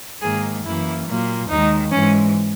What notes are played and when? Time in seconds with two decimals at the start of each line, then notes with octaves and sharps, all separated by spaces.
0.21 G#2 D#3 A#3 G#4
0.64 F#2 E3 A#3 E4
1.06 A#2 F#3 A#3
1.49 D#2 D#3 G#3 D#4
1.91 G#2 E3 G#3 C#4